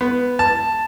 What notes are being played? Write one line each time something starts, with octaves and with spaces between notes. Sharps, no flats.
B3
A5